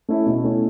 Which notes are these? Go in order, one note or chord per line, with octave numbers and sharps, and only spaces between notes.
A3 C#4 E4
B2
A3 C#4 E4